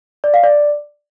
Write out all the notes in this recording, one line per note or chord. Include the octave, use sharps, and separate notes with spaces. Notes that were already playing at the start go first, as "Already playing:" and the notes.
D5
F5
D5